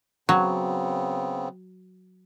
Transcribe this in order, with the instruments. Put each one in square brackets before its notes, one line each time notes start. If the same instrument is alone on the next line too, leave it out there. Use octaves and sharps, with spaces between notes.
[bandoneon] C#3 B3 C4 [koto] F#3